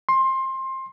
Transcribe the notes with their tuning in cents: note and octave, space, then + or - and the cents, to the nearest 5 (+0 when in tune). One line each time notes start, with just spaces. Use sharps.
C6 +20